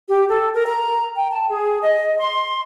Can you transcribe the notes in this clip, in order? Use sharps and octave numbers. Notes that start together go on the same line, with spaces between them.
G4
A4
A#4
A#5
G5
A5
G#4
D#5
C6